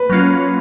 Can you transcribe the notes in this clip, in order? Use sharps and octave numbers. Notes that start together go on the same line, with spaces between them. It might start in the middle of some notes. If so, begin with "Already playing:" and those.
Already playing: B4
F#3 A#3 C#4 F4